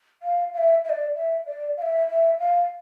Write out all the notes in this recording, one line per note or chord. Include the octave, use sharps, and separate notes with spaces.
F5
F5
E5
E5
D5
E5
D5
F5
E5
E5
F5